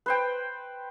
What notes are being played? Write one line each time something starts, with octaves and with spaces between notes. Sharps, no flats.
B4 C5 G5